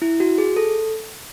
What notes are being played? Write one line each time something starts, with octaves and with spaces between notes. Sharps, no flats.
E4
F#4
G#4
A4